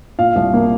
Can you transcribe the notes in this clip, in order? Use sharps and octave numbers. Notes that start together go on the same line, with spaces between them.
A#2 F5
C2
A#3